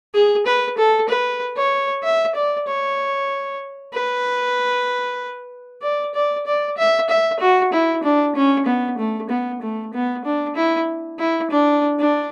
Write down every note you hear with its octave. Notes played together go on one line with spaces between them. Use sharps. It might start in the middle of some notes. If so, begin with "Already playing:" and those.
G#4
B4
A4
B4
C#5
E5
D5
C#5
B4
D5
D5
D5
E5
E5
F#4
E4
D4
C#4
B3
A3
B3
A3
B3
D4
E4
E4
D4
D4